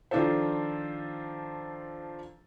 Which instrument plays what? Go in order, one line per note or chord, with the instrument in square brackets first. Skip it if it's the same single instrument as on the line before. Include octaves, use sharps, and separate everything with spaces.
[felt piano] D#3 F3 D4 F4 A4 C5